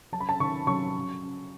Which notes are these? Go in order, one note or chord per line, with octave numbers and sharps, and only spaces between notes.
F#3 A5
B5
A5
D#3 C#6
F#3 C#6
C#3
C#3